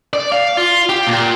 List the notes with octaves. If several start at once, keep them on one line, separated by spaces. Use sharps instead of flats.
D5
F5
F4
G4
A#2